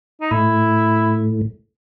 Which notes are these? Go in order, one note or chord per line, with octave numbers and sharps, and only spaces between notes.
D#4
A2 E4